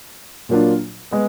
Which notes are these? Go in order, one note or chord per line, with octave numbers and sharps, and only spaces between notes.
A#2 F#3 A#3 D4 F4
G#3 B3